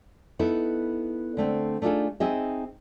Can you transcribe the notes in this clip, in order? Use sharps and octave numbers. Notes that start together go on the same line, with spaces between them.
B3 D#4 E4 A4
D3 A3 C4
A3 D4 D#4 F4 G#4 A4
C4 D#4 G#4 D#5 E5